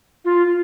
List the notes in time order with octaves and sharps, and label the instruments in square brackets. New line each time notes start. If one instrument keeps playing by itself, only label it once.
[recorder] F4